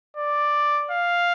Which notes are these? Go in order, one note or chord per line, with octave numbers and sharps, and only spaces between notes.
D5
F5